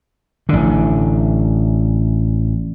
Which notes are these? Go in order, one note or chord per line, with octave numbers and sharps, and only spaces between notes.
A1 D3